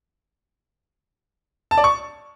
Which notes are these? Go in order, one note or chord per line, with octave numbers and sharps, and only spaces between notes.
A5
D5
C#6